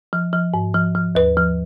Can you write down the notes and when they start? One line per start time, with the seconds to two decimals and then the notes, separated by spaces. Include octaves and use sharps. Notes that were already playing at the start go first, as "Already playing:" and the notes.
0.13 F3
0.33 F3
0.54 G#2
0.74 F3
0.95 F3
1.15 D#2 B4
1.37 F3